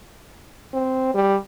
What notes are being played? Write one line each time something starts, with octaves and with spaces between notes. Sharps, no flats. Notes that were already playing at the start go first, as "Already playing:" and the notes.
C4
G3